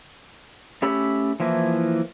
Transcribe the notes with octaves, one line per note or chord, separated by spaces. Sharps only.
A3 C#4 G4 B5 E6
E3 F3 A#3 E4